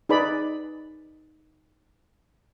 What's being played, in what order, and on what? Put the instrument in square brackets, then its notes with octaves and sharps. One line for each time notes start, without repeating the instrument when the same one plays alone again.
[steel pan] D#4 G#4 B4 D5 B5